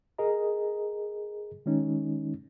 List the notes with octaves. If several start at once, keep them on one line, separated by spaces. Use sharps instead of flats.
G#4 A#4 D#5 A#5
D#3 G#3 C#4 D#4